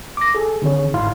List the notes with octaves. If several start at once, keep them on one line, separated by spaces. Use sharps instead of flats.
D6 A#6
G#4 A4
D3 D#3 C4 G#4 C#5
G1 G#2 E4 F5 C6